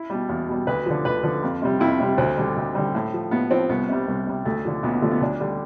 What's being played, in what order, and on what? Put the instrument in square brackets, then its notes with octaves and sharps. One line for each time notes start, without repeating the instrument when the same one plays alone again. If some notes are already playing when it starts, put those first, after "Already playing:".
Already playing: [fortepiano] E4
B2 G3
E2
B2 G3
D2 B4
D3 F3
D2 B4
D3 F3
F2
C3 G3
F2 E4
C3 G3
D2 C4
D3 G3
D2
D3 G3
A2
F3
A2 B3
F3 C4
C2 B3
C3 G3
C2
C3 G3
D2 A3
D3 F3
D2 B3
B3
D3 F3 A3
B3
D2 D4
D3 G3